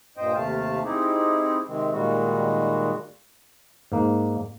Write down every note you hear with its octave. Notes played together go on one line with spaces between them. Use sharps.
G2 A#2 C5 D#5 G5
D#2 C3 A3 F5 A5
C4 D#4 E4 G4 G#4
C3 D#3 G#3 C4
A#2 D#3 G3 G#3 F#4
G#2 A#3